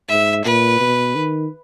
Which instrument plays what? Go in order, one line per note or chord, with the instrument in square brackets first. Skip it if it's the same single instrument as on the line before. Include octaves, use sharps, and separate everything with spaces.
[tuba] G#2 [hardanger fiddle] E5
[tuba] A#2 [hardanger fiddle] B4
[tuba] B2
D#3